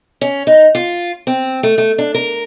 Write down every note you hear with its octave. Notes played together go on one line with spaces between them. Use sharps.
C#4
D#4
F4
C4
A3
A3
D4
A#4